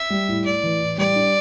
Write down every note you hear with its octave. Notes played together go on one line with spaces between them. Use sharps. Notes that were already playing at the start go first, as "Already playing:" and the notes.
Already playing: E5
G3
A2
A2 D5
E3
A2
G3 D5
D4